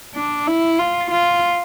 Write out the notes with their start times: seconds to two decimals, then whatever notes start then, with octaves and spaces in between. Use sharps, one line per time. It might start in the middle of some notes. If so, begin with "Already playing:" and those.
0.15 D4
0.47 E4
0.79 F4
1.11 F4